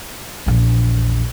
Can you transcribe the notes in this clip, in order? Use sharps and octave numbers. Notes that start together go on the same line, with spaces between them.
A#1 E2